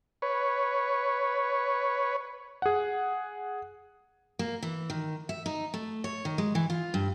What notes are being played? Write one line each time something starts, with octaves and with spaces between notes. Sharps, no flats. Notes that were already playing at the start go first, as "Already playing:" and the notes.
B4 C#5
G#4 F#5
A#3
E3
D#3
E5
D#4
A3
C#5
D#3
G#3
E3
F4
G2